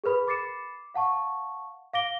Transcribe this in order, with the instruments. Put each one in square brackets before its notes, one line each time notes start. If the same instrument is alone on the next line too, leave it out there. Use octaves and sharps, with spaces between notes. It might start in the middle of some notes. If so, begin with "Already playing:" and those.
[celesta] G#4 A#4 B4 B5
B5 D6 A6 C7 C#7 E7
F5 F#5 A5 C#6
F5 D6 A#6 D7 G7